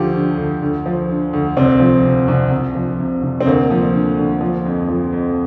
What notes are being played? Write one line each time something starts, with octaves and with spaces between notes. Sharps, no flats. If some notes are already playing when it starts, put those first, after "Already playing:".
Already playing: D2 F3 G4
D3
D2
D2
F3
D3
D2
C2 C4
F3
C3
C2
C2
F3
C3
C2
C4
D2 A#3
F3
D3
D2
F3
F2
F3
F2